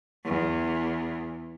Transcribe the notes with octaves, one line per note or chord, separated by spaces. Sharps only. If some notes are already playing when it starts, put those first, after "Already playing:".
E2